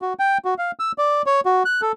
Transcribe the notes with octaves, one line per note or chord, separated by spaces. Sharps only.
F#4
G5
F#4
F5
E6
D5
C#5
F#4
F#6
A4